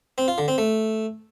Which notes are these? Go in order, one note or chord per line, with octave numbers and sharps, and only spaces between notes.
C4
F4
D3
C4
A3